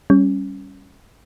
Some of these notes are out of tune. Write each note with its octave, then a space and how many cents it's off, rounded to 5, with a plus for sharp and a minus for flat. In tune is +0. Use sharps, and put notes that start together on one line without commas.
G3 +0 C#4 -5